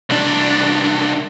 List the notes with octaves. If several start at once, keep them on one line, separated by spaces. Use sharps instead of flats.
C2 D4